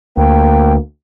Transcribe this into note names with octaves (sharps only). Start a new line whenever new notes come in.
D2 A#3 G5